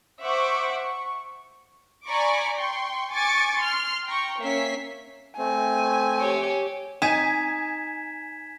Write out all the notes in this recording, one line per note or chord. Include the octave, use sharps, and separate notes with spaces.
C5 E5 F#5 C#6 D6
C#6
D5 G#5 A#5 B5 C#6 D6
G5 C6 C#6
G#5 C#6 D6 A6 C#7
C6 F6
G5 A#5 C#6
A#3 C#4 E5 B6 C7
A3 C4 G#5
G4 C#5
D#4 G#5 G#6 B6 D#7 E7